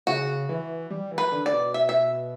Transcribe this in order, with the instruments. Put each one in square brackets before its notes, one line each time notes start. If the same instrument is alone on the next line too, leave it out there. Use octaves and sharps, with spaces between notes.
[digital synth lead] C#3 [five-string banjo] F#4
[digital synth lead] E3
G3
E3
[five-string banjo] B4
[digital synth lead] D3
[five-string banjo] D5
[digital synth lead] B2
[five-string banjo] E5
E5